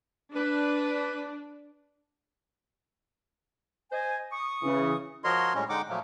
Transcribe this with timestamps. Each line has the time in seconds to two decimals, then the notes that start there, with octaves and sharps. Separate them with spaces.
0.35 D4 B4
3.92 C5 D#5 G#5
4.32 C#6 D#6
4.63 C#3 E3
5.24 F3 F#4 A#4 C#5 D#5 C6
5.55 A2 G3 G#3 C#4
5.69 D3 G#3 D#4 F#5 G5 D6
5.89 A#2 F3 F#3 A3 A#3